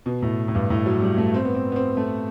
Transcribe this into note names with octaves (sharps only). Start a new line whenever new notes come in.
B2
A2
A2
G2
A2
F#3
G3
A3
C4
B3
C4
B3
C4
A3